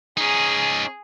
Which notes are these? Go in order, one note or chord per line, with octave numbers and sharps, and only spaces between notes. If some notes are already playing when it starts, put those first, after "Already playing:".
C#4 D#4 G#4